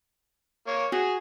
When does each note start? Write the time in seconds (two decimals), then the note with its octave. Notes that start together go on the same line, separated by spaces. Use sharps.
0.67 A#3 C#5
0.92 F#4 G#4